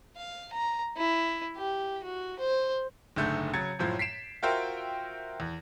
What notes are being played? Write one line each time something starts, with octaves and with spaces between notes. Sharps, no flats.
F5
A#5
E4
G4
F#4
C5
F#1 G#2 D3 A3 G6
C#3 F#3 G#6 A6 C#7
F#2 A2 F3 G#3
B6 C7 D7 E7
F4 F#4 A#4 C5 E5 G5
E2